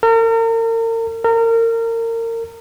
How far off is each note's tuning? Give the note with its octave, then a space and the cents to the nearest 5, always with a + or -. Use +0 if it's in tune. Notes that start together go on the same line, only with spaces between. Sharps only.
A#4 -40
A#4 -30